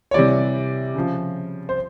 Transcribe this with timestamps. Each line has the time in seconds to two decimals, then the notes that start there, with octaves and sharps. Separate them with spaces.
0.11 C#5
0.14 C3 E3 G3 D5
0.95 C#3 F3
1.69 C5